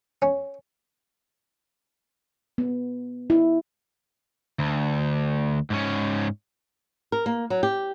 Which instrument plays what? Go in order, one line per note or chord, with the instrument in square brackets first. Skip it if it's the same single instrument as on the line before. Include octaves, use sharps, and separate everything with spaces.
[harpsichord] C#4
[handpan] B3
E4
[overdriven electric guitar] D2
G#2 C#4
[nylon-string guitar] A#4
A#3
F#3
G4